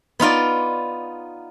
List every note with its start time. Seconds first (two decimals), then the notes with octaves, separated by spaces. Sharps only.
0.20 B3 D#4 F4 D5